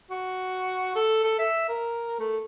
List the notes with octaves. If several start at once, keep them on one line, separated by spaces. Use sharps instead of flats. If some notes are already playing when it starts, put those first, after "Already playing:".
F#4
A4
A4
E5
A#4
A3